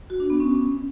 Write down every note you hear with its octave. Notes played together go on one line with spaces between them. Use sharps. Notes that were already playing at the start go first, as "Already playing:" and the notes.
F#4
D4
B3
C#4